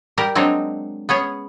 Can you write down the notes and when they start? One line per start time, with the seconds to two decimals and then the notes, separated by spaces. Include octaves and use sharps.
0.18 G3 G4 A#4
0.35 F#3 G#3 C4 D4 D#4
1.09 B3 C#4 G#4 C#5